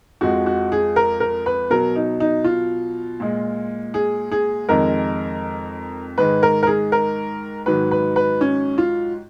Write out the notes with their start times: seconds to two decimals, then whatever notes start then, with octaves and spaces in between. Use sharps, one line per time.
0.21 F2 F3 G#3 F#4
0.46 F#4
0.72 G#4
0.96 A#4
1.20 A#4
1.46 B4
1.70 B2 F#3 A#4
1.96 D#4
2.20 D#4
2.44 F4
3.20 A#2 G#3
3.94 G#4
4.32 G#4
4.69 F2 D#3 G#3 A#4
6.18 G#2 D#3 G#3 B4
6.43 A#4
6.63 A#4
6.67 G#4
6.92 A#4
7.66 G#2 D#3 F#3 B4
7.91 B4
8.16 B4
8.41 C#4
8.78 F4